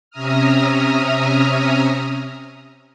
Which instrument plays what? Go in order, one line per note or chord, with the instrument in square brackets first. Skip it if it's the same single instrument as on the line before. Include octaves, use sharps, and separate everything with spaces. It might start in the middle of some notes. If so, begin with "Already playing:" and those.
[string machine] C3 C#4 E5 A#5 D#6 F6